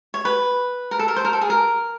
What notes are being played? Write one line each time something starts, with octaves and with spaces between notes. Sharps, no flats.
C#5
B4
A#4
A4
A#4
C5
A#4
A4
G#4
A#4